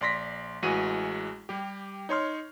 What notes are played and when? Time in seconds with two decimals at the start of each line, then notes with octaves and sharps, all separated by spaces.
0.01 A#1 D5 C6 A#6 B6
0.63 A1 E3 G#3 F#4 G#4 D#7
1.49 G3 G4
2.09 D#4 C#5 C6 F6